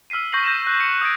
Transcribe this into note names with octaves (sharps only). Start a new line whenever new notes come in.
E6 F6 B6 C7 D#7
C#6 G6 A#6 C7 F#7
G6 A#6 D#7 E7
F#6
C#7
D#6 F#6 G#6 D7